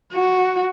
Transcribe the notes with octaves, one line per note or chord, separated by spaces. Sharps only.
F#4